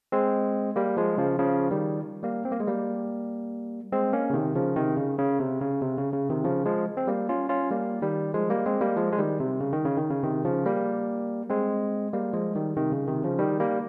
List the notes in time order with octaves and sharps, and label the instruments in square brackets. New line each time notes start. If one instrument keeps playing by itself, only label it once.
[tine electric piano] G#3 C4
G3 A#3
F3 G#3
C#3 F3
C#3 F3
D#3 G3
G3 A#3
C4
A#3
G#3
G3 A#3
G#3 C4
A#3 C#4
C#3
C3 D#3
C#3 F3
C3 D#3
C#3
C#3
C3
C#3
C3
C#3
C#3
C3 D#3
C#3 F3
F3 G#3
C4
G3 A#3
C#4 F4
C#4 F4
G3 A#3
D#3 G3
F3 G#3
G3 A#3
G#3 C4
G3 A#3
F3 G#3
G#3
D#3 G3
C3
C#3
D#3
C#3
D#3
C#3
C3 D#3
C#3 F3
G3 A#3
G#3 C4
G3 A#3
F3 G#3
D#3 G3
C3 D#3
C#3
C3 D#3
C#3 F3
D#3 G3
G3 A#3